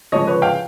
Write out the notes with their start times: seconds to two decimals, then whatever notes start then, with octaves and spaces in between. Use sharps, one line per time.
0.12 C#3 F3 G#3 C#5 D#5
0.27 B4 C#5
0.42 F5 G5